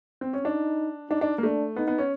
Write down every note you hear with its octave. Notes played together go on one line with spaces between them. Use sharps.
C4
C#4
D4 D#4
D4 D#4
D4
A#3
A3 D4
B3 D#4
B3
C#4